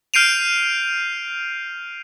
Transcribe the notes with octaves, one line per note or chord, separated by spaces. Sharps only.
F6 G6 C7 D7 D#7 F7